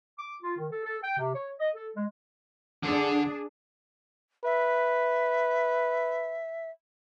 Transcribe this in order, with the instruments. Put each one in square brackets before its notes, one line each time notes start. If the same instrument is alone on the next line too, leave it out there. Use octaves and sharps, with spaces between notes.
[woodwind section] D6
F4
D#3
A4
A4
G5
C3
C#5
D#5
A4
G#3
[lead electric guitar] D3 [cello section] D4 G#4
[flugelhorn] B4 [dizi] E5